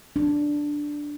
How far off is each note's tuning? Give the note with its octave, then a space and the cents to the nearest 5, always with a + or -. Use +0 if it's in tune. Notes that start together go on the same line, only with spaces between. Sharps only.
D4 +0